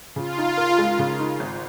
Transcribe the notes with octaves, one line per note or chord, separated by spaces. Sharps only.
C#3 F4
D#4
A#4
G#3
C#3
D#4
G#1